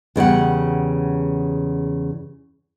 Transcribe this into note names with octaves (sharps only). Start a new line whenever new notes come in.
E2 C#3 G3 F#5